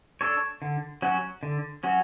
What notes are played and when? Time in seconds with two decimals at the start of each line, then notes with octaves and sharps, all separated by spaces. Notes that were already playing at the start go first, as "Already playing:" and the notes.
0.21 D4 A4 C#5
0.62 D3
1.02 F#3 C#4 F#4
1.43 D3
1.83 F#3 C#4 F#4